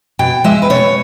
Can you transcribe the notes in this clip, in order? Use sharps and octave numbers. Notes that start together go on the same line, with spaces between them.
B2 G5
G#3 E5
B4
B2 C#5